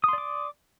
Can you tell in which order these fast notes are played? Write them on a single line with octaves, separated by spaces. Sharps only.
D#6 C6 D5 D6